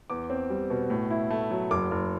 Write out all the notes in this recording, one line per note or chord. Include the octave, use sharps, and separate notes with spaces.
E2 D6
C4
G3
B2
A2
E4
A3
F#3
F#1 D6
F#1